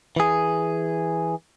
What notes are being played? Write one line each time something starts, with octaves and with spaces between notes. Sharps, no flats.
E3 G#4